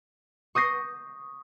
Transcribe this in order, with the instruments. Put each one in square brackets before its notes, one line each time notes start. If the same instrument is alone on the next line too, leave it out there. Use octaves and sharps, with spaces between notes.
[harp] C#6 D#6 G6 A#6 C7